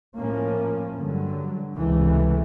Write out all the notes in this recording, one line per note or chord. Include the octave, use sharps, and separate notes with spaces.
A2 F3 A#3 C#4
G2 D3 F#3
C#2 C3 E3 A3